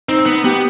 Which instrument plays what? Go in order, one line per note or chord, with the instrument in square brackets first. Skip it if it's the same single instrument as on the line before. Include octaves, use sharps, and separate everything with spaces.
[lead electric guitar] C4 [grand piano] D#4
[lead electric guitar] B3
[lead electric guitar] B3 [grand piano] G4